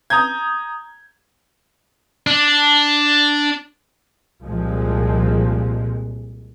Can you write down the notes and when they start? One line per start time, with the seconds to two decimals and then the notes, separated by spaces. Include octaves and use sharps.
0.10 A#5 D#6 G6 G#6
2.27 D4
4.44 C2 A#2 F3 G#3